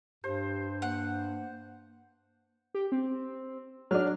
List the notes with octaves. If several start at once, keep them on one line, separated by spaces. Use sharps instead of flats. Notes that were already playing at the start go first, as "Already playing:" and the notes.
G2 G4 C5
A#3 F#5
G4
C4
F#3 D4 F6